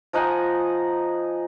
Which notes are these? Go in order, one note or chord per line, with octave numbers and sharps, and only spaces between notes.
F3 D#4 F#5 G#5